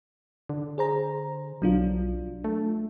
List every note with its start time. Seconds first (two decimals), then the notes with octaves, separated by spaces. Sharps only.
0.49 D3
0.78 G#4 C5 A#5
1.62 B1 F#3 D4 F4
2.44 A3